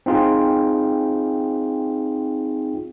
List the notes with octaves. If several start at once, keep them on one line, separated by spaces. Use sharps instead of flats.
C4 D#4 F4 G#4 G5